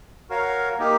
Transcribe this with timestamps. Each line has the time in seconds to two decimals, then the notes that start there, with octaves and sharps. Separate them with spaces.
0.30 F#4 A#4 C#5 F5
0.78 A#3 D#4 G4